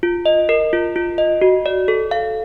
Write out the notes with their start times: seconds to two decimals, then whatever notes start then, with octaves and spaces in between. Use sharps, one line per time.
0.03 F4
0.26 D#5
0.49 A#4
0.73 F4
0.96 F4
1.18 D#5
1.42 F#4
1.66 D5
1.88 A4
2.11 F5